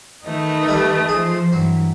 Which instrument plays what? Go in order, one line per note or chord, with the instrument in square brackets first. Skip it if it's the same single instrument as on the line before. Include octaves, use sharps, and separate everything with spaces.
[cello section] D#3 D#4 B4 [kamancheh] A3 D#5
[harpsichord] G3 A4
[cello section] F3 C5 [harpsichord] G#4
[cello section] G2 E3 [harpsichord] F#3